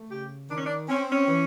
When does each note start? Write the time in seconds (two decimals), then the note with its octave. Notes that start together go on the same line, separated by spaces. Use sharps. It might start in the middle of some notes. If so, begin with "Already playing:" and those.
Already playing: A3
0.10 C#3 G4
0.49 D#3 D4
0.57 C#4
0.64 D4
0.89 C4 C#4
1.11 C#4
1.28 E3